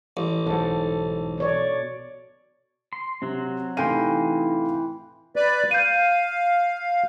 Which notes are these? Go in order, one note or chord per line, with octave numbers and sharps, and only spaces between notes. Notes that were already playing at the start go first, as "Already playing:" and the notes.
A1
B1 G#2 A4
B2 C#5 D5
C6
C3 F#3 C4
C3 E3 A3 D#4 F5 G5 C6 D#7
B4 D5
F5 G6 D#7